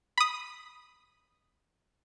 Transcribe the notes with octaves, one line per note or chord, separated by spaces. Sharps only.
B5 D#6